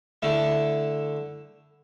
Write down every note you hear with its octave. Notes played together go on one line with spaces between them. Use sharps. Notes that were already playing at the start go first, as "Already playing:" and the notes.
D3 A3 E4